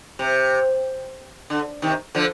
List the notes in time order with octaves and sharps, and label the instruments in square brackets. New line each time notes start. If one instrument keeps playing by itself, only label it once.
[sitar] C3
D3
C3 D#3
D3 F3